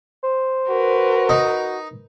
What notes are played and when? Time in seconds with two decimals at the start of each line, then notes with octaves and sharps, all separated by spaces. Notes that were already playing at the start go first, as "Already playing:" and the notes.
0.24 C5
0.70 F#4 A#4 B4
1.29 D#4